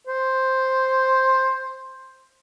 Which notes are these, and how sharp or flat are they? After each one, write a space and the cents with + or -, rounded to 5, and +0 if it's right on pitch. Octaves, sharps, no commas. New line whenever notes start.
C5 +5